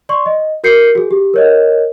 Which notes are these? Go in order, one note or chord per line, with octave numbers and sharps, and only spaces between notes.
D5 C6 C#6
D#5
F#4 A#4 G6 C7 C#7
F#4 G#4
G4
A#4 C#5 D#5